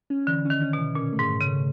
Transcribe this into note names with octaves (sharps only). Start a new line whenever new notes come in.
C#4
D3 E3
C#4
D#3
C#4
B2
E3
A#2 C#4
A3
G#2
A3
C#3
A3